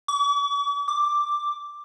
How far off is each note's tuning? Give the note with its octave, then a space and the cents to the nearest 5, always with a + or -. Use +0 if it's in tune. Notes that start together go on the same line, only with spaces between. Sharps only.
D6 -45
D6 +5